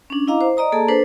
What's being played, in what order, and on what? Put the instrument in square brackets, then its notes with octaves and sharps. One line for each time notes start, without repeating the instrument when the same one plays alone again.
[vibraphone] C#4 D4
E4 D#5 F5 A#5 D6
C5
D5 D#5 A#5 D#6
A#3 G#4 A4 D5 A5 A#5
D4 A4 B4 C5